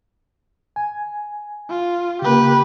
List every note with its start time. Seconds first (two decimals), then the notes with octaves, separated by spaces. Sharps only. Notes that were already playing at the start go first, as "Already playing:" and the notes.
0.76 G#5
1.70 F4
2.22 C#3 A#3 G4 B4